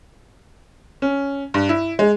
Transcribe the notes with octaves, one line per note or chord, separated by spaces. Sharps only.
C#4
G2
E4
G#3